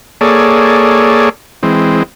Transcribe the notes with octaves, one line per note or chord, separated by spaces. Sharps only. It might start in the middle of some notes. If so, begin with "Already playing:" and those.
A#3 G#4 A4 C#5 D5
E3 G#3 C4